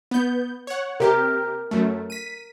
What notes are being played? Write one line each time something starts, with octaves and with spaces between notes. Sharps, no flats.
B3 G6
C#5 F#5
C3 G4 A#4
F#2 A3
B6 D#7